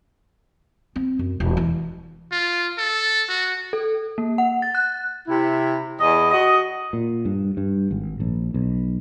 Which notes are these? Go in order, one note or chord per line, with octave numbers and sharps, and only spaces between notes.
C4
F#2
E1
E3
F4
A4
F#4
A4
A#3
F#5
A6
F#6
C3 E4
E2 D#5
F#4 D#5
A#2
G2
G2
G#1
A#1
B1